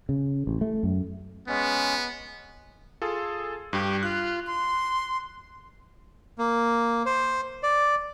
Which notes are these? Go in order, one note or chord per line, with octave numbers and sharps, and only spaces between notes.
C#3
A1
A3
F#2
G#3 B3 C#4
F4 G#4 A4
G2 G4
F4 F#6
C6
A#3
C5
D5